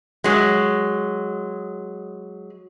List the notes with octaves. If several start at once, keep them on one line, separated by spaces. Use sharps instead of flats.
F#3 G#3